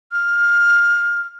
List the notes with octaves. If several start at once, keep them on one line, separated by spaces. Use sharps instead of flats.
F6